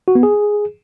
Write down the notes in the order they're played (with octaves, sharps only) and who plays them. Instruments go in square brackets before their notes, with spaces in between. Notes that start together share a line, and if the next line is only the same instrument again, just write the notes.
[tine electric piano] F#4
B3
G#4